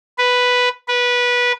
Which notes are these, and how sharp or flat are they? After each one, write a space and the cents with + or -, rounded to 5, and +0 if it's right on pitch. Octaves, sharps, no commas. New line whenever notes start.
B4 +0
B4 -15